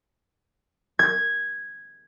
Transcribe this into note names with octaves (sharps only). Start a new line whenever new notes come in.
G#6